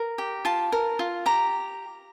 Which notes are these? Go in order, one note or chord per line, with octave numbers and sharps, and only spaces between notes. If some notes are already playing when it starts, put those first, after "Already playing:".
Already playing: A#4
G4
F4 A5
A#4
F4
G4 A#5